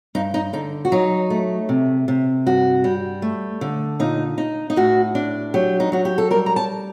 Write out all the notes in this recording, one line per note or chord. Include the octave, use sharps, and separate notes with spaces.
G2 D#4
D#4
D3 D#4
F#4
F#3 D#4
A3
C3
C3
G2 F#4
G3
A3
D3
A#2 D#4
D#4
D#4
A2 F#4
D4
F#3 G4
D#4
F#3 F#4
G4
A4
G3 A#4
A#5
A5